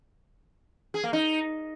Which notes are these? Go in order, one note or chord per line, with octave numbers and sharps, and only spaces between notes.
G#4
A#3
D#4